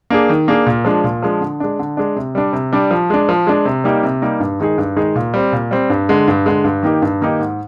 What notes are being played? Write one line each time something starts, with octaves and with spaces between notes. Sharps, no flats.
A#3 D4 G#4
D#3
A#3 D4 G#4
A#2
F3 G#3 D4
A#2
F3 G#3 D4
D3
G#3 D4
D3
G#3 D4
C3
G3 D4
C3
G3 D4
F3
G#3 D4
F3
G#3 D4
C3
G3 A#3 D#4 G4
C3
G3 A#3 D#4 G4
G2
D#3 G#3 D#4 G#4
G2
D#3 G#3 D#4 G#4
A#2
G3 C4
A#2
G3 C4
G2
D3 G#3
G2
D3 G#3
G2
D#3 A#3 D#4 G4
G2
D#3 A#3 D#4 G4
G#2